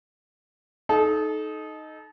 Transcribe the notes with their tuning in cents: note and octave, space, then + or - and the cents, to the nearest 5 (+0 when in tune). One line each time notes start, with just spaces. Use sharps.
D#4 +0 A4 -30